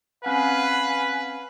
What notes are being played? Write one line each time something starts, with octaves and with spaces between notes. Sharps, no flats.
C4 C#4 B4 F5 F#5 G#5